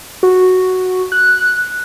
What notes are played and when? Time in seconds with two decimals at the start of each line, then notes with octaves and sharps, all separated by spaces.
0.23 F#4
1.12 F#6